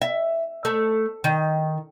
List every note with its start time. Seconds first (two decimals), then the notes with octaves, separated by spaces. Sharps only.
0.02 E5
0.65 A3
1.24 D#3